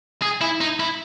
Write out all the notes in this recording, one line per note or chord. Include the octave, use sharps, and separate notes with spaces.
G#4
E4
D#4
E4